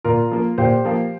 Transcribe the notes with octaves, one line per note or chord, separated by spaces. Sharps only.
A#2 F4 A#4
F3 A#3
A#2 G4 C5
F3 A#3